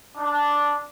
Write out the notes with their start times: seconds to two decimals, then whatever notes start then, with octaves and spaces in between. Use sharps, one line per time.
0.17 D4